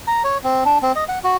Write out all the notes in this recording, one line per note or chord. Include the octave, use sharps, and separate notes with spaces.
A#5
C#5
C4
D4
C4
D#5
F#5
F#4